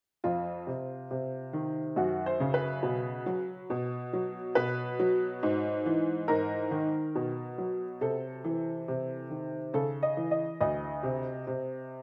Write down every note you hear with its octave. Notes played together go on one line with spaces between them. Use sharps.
F2 F4
C3
C3
D#3
F#2 F#4
C5
C#3
B4
B2
F#3
B2
F#3
B2 B4
F#3
G#2
E3
G#2 A#4
D#3
B2
F#3
C3 A4
E3
C3
D#3
C#3 A4
D#5
E3
D#5
D2 D#5
C3
C3